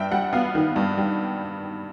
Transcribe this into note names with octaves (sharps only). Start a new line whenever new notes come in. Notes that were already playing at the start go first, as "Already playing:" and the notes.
Already playing: G2 E5 G5
G3 F#5
B3 F5
D#3
G2
G3